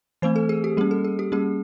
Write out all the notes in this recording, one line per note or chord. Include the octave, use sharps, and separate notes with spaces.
E3 A3 C4 C5
A4
G#4
G4
G3 A#3 C#4 G#4
A4
G#4
G4
G3 A#3 C#4 G#4